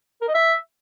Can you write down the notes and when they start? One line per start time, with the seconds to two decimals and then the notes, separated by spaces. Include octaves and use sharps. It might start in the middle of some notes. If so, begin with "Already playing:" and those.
0.22 A#4
0.28 D#5
0.35 E5